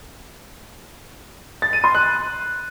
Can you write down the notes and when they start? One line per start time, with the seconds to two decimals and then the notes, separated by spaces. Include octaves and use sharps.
1.62 A6
1.73 D#7
1.84 C6
1.95 F#6